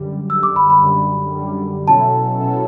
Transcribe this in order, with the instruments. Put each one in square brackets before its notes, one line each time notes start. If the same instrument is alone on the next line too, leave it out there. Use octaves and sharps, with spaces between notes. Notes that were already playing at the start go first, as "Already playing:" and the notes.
Already playing: [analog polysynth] F#2 D3 G3
[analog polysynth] F#2 D3 G3 [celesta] E6
[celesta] D6
B5
B5
[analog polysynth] F#2 D3 G3
F#2 D3 G3
[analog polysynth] B2 F#3 C#4 E4 A4 [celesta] A5
[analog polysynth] B2 F#3 C#4 E4 A4